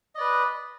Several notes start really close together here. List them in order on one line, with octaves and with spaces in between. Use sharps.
D#5 D5 B4